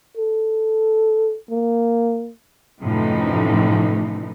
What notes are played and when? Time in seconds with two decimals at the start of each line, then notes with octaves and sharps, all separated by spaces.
0.17 A4
1.50 A#3
2.82 F#2 A2 C3 E3 F3 D#4